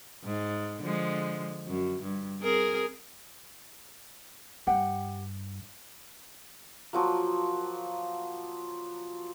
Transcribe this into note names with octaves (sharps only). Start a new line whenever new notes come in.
G#2
D3 F3 G#3
F#2
G2
C4 G#4 A#4
G2 G4 F#5 G5
F3 F#3 A#3